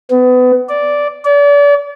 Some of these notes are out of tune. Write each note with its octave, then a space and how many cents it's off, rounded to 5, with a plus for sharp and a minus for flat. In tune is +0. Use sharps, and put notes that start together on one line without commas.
B3 +30
D5 -5
D5 -35